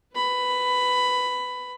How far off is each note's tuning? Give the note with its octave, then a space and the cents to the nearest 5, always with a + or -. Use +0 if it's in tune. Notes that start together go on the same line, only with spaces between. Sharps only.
B4 +20 B5 +10